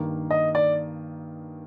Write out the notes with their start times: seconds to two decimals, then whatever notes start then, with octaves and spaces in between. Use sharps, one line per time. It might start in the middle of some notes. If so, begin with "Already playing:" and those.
Already playing: G2 D#3 A#3
0.31 D#5
0.55 D5